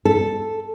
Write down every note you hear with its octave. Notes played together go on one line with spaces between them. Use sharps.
A4